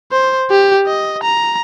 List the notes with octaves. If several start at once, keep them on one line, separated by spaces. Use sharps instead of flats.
C5
G4
D#5
A#5